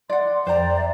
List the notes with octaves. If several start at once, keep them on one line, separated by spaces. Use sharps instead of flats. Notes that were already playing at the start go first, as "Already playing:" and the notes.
D5 F#5 C6
F2 C5 D5 G5 A#5
E5